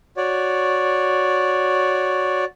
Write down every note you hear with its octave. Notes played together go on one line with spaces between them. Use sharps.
F#4 C#5 D5